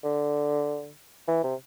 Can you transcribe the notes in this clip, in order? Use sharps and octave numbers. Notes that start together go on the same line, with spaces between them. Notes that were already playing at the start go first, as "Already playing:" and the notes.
D3
E3
C3